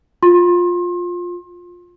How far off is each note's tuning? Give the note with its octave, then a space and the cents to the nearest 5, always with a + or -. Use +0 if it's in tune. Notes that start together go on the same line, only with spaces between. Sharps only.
F4 +10 C6 +35